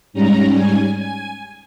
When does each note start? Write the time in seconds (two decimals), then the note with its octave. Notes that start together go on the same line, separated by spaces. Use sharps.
0.13 G#2 G3 C#4 A#5
0.55 G#5
0.98 G#5